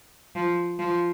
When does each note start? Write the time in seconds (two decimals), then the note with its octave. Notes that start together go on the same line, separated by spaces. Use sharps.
0.35 F3
0.79 F3